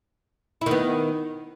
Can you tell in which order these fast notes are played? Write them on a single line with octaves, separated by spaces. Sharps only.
E4 D#3 B3